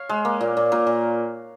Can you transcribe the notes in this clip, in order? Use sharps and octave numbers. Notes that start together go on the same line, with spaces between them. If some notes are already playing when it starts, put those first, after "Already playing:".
Already playing: C#5 F5
G#3
A#3
A#2
A#2
A#2 A#4
A#2